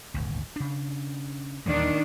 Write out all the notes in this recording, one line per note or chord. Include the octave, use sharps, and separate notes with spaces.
D#1 G#1 D2
C#3 D4
D#2 A#2 D#3 E3 G3 D4